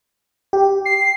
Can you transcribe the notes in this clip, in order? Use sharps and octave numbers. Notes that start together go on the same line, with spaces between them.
G4
C7